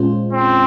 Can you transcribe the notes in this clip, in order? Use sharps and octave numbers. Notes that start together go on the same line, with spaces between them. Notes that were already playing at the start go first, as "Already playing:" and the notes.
Already playing: A#2 G#3 C#4 F4 C5
C4